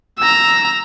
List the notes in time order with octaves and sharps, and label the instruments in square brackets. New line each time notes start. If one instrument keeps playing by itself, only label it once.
[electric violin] A#5 E6